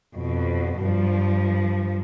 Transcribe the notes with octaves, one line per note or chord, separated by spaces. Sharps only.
F2 B2
G2 F3